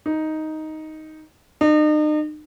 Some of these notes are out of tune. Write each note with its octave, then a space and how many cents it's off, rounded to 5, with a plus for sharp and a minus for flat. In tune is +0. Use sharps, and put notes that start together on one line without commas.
D#4 +5
D#4 -40